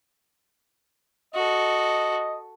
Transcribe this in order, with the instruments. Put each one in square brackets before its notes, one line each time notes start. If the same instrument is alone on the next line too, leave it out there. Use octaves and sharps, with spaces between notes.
[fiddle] F#4 A4 [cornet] D#5